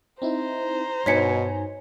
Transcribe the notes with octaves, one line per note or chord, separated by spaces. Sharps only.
C4 D#4 E4 C5 A#5
G2 B2 D#4 C#5 G#5 B6 C#7